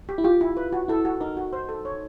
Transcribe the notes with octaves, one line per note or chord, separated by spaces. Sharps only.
G4
E4
F4 G4
E4
B4
F#4
E4 A4
F#4
D#4 A#4
F#4
C5
A4
C#5